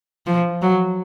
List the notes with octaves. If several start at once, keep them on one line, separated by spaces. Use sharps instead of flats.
F3
F#3